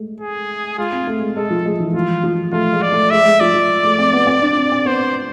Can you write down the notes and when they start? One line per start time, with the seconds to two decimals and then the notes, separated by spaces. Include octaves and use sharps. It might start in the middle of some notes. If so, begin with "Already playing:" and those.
Already playing: G#3 A3
0.20 G#4
0.78 G#3 F4
0.92 C4
1.07 A3
1.21 G#3
1.37 G#3 A4
1.50 F3
1.66 G#3
1.80 E3
1.94 F3 F4
2.24 F3
2.52 A3 F4
2.73 G#3
2.82 D5
2.92 A3
3.10 G#3 E5
3.25 G#3
3.40 F3 D5
3.54 F3
3.84 A3
3.99 C4
4.13 B3
4.27 C4
4.42 D4
4.57 C4
4.72 C4
4.85 B3 C5